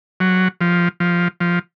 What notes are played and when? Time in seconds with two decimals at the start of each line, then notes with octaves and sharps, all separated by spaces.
0.20 F#3
0.61 F3
1.00 F3
1.40 F3